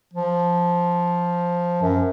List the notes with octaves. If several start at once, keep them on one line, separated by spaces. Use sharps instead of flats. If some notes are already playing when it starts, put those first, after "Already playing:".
F3
F#2